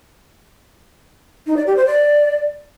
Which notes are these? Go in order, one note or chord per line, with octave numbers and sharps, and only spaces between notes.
D#4
D5
G4
C5
D5